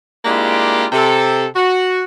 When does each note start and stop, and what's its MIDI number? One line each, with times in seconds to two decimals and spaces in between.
0.25 0.86 56
0.25 0.86 58
0.25 0.86 62
0.25 0.86 64
0.25 0.86 65
0.25 0.86 67
0.92 1.46 48
0.92 1.46 69
1.56 2.02 66